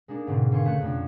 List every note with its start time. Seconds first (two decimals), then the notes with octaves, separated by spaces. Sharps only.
0.08 G#3 A#3 D4 D#4
0.27 G#2 B2 D3 C4
0.51 G#1 D3 C5 F5 G#5 C#6
0.64 C#3 A3 F#6 C#7
0.81 F2 C3 A3 D4